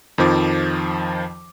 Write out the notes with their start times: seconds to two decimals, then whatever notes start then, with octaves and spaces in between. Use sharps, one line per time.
0.18 F2 D#3 F3 D6